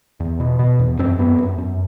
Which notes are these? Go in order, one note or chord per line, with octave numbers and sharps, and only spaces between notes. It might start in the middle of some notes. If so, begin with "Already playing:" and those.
E2
B2
B2
E2
F#2 C4
F#2 B3
F#2
F#2